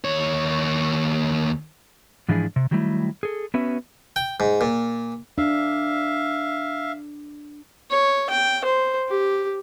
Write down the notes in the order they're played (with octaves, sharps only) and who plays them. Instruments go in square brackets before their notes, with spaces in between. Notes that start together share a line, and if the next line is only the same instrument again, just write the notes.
[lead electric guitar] D#2 C#5
[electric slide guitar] G#2 E3 F3 D4 E4 G#4
C3
D#3 F#3 G3 A3 E4
G#4 A4
B3 C#4 F#4 B4 E5
[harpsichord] G5
G#2
A#2
[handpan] D4 [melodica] E5 F5
[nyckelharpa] C#5
G5
C5
G4